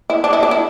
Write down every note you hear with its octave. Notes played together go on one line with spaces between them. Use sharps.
E4
D4
E4
D4
E4